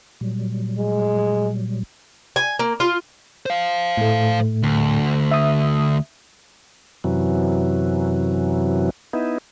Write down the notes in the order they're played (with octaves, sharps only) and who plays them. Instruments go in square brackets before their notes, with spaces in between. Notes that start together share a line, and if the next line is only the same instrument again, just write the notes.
[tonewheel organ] A#2 F#3 G3
[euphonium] G#3
[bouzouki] G#5
A#3
F4
[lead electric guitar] C5 F5
[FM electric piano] A2 A3
[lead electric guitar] D2
[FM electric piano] E5 D#6
[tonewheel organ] F#2 C3 E3 F#3
B3 D#4 E4